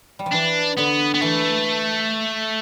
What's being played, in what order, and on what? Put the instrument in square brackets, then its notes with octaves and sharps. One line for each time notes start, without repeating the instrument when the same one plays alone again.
[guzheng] G3
F3
[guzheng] E3 [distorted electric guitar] D4
[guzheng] D3 [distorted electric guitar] B3
[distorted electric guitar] B3
[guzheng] E3 [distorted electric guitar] A3